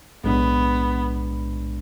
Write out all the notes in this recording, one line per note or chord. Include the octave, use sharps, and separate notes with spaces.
B1 A2 G#3 B3 D4